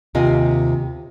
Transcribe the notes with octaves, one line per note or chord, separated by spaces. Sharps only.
D#2 C3 F4 D#5 G#5